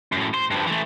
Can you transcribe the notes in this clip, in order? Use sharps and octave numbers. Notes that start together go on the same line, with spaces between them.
F#2 A2
C5
G2 F3
E3 A3